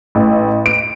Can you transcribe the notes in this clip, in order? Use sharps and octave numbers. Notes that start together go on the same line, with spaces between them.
A1
D7